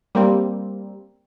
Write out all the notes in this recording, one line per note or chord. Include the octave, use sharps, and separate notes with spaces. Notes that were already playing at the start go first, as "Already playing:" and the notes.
G3 A#3 C4